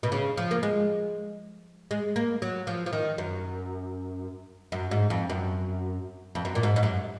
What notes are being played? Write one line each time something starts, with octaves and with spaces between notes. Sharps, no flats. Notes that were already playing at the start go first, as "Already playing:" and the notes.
B2
C#3
F3
A#3
G#3
G#3
A#3
F#3
F3
F3
D#3
F#2
F#2
G#2
F2
F#2
F2
F#2
A#2
G#2
G#2
F#2